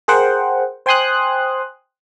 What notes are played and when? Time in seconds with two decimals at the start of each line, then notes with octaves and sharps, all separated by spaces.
0.08 G#4 A#4 C5 F#5 G5
0.86 C5 G5 G#5 C6 D#6 F#6